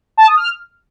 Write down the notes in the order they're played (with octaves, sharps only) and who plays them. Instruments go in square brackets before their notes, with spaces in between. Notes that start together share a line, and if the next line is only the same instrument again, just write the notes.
[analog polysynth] A5
D#6
F6